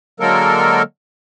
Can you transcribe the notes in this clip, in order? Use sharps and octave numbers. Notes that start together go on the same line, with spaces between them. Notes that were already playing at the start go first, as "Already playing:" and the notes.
D3 F#3 G#3 A#3 A4 A#4